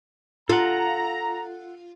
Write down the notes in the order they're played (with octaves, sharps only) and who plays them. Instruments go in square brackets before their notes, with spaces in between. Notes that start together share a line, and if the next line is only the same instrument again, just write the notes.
[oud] F4 [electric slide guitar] A4 F#5 [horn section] A#5